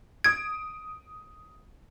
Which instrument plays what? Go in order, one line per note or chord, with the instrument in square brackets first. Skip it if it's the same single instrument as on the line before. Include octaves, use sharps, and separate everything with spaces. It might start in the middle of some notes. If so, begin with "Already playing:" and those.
[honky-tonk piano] D#6 D7 [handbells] G#6